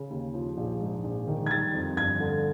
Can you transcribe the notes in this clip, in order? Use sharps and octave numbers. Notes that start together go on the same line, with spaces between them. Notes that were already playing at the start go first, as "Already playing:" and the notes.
Already playing: C#3
D#2
F3
A#1
G#2
A#1
D#3
G#6
G3 A6
F2
G1 G#6
D3